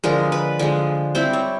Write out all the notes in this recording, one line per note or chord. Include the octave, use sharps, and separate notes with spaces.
D3 F3 G#3 A#4
B4
D3 F3 G#3
G3 C4 E4 C5
C#5